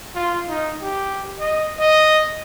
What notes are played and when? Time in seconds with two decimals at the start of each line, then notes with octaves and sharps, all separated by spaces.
0.15 F4
0.49 D#4
0.82 G4
1.40 D#5
1.79 D#5